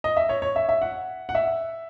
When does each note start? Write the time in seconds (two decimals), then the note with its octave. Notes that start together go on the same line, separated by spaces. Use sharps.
0.04 D#5
0.17 E5
0.29 C#5
0.42 C#5
0.56 E5
0.69 E5
0.82 F#5
1.29 F#5
1.35 E5